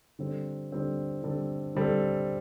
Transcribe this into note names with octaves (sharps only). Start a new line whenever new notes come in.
D3 G3 C4 A4
D3 G3 C4 A4
D3 G3 C4 A4
D3 G3 C4 A4